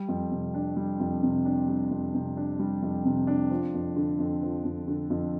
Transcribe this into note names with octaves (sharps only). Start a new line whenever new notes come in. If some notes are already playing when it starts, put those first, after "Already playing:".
Already playing: G3
F2
C3
D4
G3
F2
C3
D4
G3
F2
C3
D4
G3
F2
C3
D4
F3
F2
D3
F2
F3
F2
D3
F2